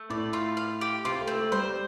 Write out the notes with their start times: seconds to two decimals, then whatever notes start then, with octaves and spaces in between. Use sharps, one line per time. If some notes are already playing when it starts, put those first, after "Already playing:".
Already playing: A3
0.10 A2 D5
0.33 F4
0.57 F5
0.81 G4
1.05 C3 F4
1.20 A3
1.27 C4
1.36 A3
1.52 G3 C5